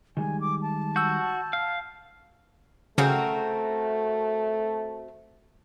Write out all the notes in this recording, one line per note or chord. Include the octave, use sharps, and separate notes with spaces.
D#3 G3 G#3 G#5
D6
A5
F#4 E6 G6
F5
C#3 A3 C4 F#4 A#4